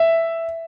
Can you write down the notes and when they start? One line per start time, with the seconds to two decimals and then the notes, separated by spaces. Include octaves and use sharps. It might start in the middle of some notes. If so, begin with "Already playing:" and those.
Already playing: E5